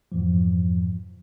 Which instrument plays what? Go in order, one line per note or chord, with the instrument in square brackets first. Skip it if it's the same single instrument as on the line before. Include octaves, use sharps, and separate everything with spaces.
[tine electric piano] F2 G#2 E3 F3